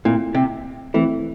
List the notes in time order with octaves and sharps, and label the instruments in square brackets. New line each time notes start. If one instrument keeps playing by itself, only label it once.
[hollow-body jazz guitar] A#2 [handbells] A3 C4 E4 A4
[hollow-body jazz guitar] C3
[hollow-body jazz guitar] E3 [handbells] A3 C4 E4 A4